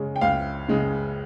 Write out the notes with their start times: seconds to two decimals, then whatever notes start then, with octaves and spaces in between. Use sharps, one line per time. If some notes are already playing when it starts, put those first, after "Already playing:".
Already playing: C#3 G#3 C#4
0.16 G5
0.21 C#2 F5
0.69 C#3 G#3